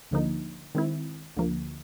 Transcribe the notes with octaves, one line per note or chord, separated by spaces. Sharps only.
D2 D3 F3 A#3 D#4
D#3 G#3 C4 E4
D2 D3 F3 A#3